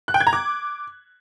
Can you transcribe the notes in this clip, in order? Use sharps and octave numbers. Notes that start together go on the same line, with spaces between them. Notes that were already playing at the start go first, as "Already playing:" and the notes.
F#6
G5
G#6
A#5
D6